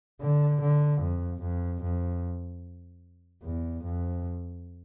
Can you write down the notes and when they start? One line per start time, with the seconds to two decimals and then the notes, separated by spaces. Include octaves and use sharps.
0.21 D3
0.61 D3
1.01 F2
1.42 F2
1.82 F2
3.43 E2
3.84 F2